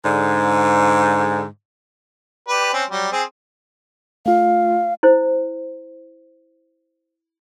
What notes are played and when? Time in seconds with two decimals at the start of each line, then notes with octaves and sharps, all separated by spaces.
0.04 G#2 D3
2.48 G4 B4 D5
2.73 C4 C#4
2.90 F#3 G3
3.12 C4 G#4
4.26 A3 F4 F5
5.03 E4 C5